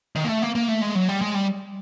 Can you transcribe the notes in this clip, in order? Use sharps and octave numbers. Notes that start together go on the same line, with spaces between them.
D#3
A#3
A3
A#3
A#3
A3
G#3
F#3
G3
G#3
G3